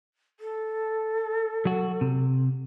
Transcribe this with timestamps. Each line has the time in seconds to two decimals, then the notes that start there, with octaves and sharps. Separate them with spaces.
0.39 A4
1.65 F#3 F#4
2.01 C3